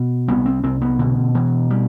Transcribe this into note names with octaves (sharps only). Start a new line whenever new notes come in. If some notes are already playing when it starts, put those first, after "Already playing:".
Already playing: B2
C2 B3
C4
C2 C4
B3
B2 D3
B2 E3
G3